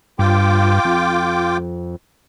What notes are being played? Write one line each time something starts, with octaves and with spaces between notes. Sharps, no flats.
G2 F4 G5 D6
F2